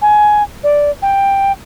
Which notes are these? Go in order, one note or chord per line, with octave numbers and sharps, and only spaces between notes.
G#5
D5
G5